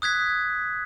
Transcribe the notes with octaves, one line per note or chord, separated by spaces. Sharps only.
D#6 F#6 G#6 B6